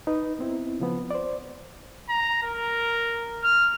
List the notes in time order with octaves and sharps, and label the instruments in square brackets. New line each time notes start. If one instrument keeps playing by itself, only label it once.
[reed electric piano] D#4 B4
B3 C4 E4
C#3 F3 B3
C5 D5
[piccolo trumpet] A#5
A#4
F6